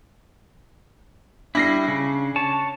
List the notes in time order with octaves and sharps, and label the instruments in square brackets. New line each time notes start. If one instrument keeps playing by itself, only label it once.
[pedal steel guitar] G3 E4 [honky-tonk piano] D4 A#6 C7
[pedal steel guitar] C#3
C#5 A5